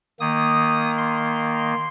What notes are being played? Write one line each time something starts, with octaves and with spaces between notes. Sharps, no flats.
D#3 A#3 D#6
C6